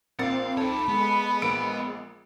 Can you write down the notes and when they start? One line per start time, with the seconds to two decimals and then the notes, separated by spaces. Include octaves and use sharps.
0.19 A#1 A#3 C4 F5 F#5 A6
0.57 D#4 A4 C#5 B5
0.88 G#3 B3
1.42 A#1 A#3 D7